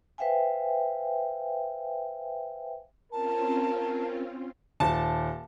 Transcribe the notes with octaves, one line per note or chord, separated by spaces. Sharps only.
B4 C5 E5 F5 G5 G#5
C4 C#4 F4 A#4 A5
D#1 A5